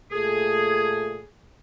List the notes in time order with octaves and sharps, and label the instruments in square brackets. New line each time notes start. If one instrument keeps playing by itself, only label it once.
[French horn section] A#2 A3 A4 [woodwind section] G#4